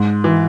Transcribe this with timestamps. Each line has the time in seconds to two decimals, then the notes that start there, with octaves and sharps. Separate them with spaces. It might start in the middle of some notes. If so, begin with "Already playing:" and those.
Already playing: G#2
0.24 E3